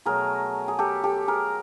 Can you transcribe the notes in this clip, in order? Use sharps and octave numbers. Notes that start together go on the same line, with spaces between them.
B2 F#3 A3 G#4 A#4
G#4
G4 A4
G4 A4
G#4 A#4